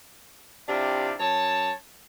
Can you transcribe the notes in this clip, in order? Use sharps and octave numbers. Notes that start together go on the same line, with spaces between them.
C3 D4 E4 F4 G4
F#2 C#5 A5